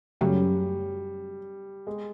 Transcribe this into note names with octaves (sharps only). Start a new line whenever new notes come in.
F#2 C#3 F#3 G3 A3 C#4
G#3